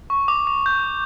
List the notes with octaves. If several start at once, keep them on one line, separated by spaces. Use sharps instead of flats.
C#6
D6
D6
G6